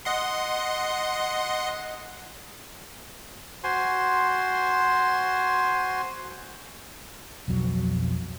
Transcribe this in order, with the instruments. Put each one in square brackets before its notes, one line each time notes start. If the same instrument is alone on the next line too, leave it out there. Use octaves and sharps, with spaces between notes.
[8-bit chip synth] D#5 F#5 C6
[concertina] F#4 C5 G#5 C6
[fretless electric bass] B1 F2 F#3